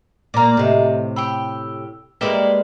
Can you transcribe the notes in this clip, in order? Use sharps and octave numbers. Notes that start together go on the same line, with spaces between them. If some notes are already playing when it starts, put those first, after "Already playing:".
A#2 A#3 D5 A#5
A2 C3 G4 D#5 E5
G4 G5 B5 E6
G3 G#3 A#3 B4 D5 E5 G5